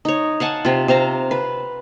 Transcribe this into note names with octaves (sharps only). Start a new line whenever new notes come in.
D#4 C#5
F5 F#5 G#5 A5
C3 F4
C3 C5 F5 A#5
B4